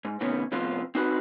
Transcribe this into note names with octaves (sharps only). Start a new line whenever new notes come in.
G#2
A2 C3 D#3 B3 C#4
A2 C3 F3 B3 C4 F4
C4 D#4 F#4 B4